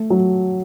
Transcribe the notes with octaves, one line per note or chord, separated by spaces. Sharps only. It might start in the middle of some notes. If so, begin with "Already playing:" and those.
Already playing: A3
F#3